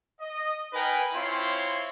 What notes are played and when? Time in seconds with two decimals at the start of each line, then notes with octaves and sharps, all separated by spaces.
0.19 D#5
0.73 D#4 A#4 B4 G5 G#5
1.14 C4 E4 F4 C#5 C6